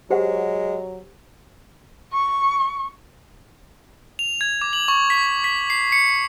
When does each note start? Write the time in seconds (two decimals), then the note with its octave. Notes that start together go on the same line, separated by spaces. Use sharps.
0.10 F#3 G#3 G4 C5 F#5
2.13 C#6
4.19 F7
4.41 G#6
4.61 D6
4.73 F#7
4.88 C#6
5.10 B6
5.44 B6
5.70 C7
5.92 C#7